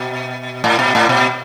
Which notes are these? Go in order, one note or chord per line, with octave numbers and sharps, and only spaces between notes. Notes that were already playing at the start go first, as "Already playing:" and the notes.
Already playing: B2
A2
B2
A2
B2